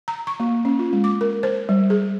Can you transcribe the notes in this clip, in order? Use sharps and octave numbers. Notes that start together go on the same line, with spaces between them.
A#5
C#6
A#3
C#4
F4
G#3
D6
A#4
C5
G3
G#4